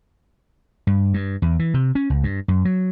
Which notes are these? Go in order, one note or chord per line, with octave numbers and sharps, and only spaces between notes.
G2
G2
E2
E3
C3
C#4
C#2
G2
F#2
F#3